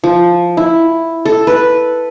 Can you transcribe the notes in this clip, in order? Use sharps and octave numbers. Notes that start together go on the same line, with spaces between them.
F3
E4
A4
B4